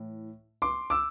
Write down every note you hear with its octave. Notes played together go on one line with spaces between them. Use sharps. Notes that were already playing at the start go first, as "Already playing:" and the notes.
Already playing: A2 E3
C6 D6
D6 E6